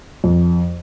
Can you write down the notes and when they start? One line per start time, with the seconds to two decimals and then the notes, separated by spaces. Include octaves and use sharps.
0.24 F2